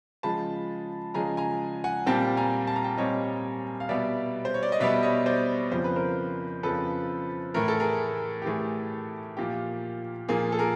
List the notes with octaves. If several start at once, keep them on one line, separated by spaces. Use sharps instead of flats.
C#3 F3 G#3 A5 B5
C#3 F3 G#3 G#5 A#5
G#5 A#5
F#5 G#5
A#2 G3 C4 G5 A5
G#5 A#5
A5
A#5
G5 A5
A#2 G3 C4 C#5 D#5
F5
B2 G3 B3 D5 E5
C5
C#5
D5
D#5
B2 G3 B3 D5 E5
C#5 D#5
C5 D5
F2 C#3 F3 C5
B4
A#4 C5
F2 C#3 F3 A4 B4
A2 E3 A3 A#4
A4
G#4 A#4
G4
A2 E3 A3 G#4
A#2 F3 A#3 G4
A#2 F3 A#3 G#4
A4
G#4 A#4